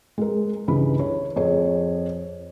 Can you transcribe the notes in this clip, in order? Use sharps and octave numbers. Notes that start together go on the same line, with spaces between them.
G#3 A#4
C#2 G2 E3 B5
C#5
F2 G#4 C#5